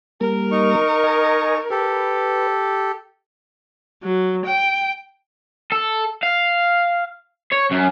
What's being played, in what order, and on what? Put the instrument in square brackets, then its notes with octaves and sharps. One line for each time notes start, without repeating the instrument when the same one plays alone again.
[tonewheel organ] G3 A#3 [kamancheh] A#4
[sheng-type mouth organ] D#4 C#6
[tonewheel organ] D#5 G#5 A#5
[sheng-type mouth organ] G4 A4 [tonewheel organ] B4
[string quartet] F#3
G5
[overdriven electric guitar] A4
F5
C#5
F#2